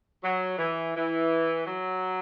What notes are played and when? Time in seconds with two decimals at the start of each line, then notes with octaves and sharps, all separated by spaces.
0.23 F#3
0.58 E3
0.96 E3
1.67 F#3